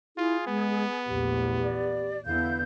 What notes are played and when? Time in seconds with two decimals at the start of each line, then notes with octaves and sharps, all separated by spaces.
0.17 E4 F4 G#4
0.47 G#3 B3
1.06 A#1 E2 A3 G4
1.63 D5
2.26 E2 D3 B3 E4 F5 G6